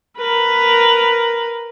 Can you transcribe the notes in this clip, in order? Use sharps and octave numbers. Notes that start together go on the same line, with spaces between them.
A#4 B4